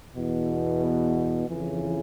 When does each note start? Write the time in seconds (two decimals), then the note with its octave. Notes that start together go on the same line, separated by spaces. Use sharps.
0.16 E2 B2
0.81 B3
1.47 F2 C#3 E3